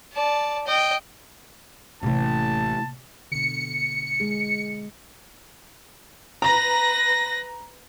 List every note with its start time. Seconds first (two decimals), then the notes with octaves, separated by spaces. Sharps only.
0.13 D5 A5
0.67 D#5 G5
2.03 A1 A2 C3 A#3 A5
3.32 B2 D3 C#7
4.20 G#3 G#4
6.42 B4 A#5 A#6